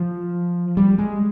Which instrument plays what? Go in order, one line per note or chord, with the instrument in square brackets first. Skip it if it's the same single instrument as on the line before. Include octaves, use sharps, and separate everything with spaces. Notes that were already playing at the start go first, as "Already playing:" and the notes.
Already playing: [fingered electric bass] F3
G3
G#3